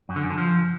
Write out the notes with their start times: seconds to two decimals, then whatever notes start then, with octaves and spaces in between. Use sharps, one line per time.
0.09 F#2
0.16 D3
0.23 F#2
0.30 D3
0.38 F3